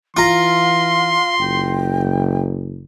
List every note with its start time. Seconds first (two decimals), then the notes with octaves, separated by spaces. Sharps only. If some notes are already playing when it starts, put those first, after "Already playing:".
0.17 E3 F4 F5 A#5 C6
1.40 F#1 G5